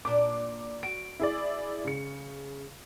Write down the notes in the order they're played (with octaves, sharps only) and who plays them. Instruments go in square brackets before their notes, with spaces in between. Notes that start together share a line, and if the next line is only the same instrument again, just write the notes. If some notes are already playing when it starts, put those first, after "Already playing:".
[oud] A#2 D4 [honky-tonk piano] D6
[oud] F#4 [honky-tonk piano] D7
[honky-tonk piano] E4 G#4 D5
C#3 C#7